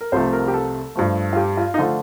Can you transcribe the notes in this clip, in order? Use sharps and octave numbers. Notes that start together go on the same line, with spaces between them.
A#4
C2 C3 F3 A3 C5
A#4
G4
A4
G2 F3 A3
F4
G4
F4
D#4
D3 F3 A3 F4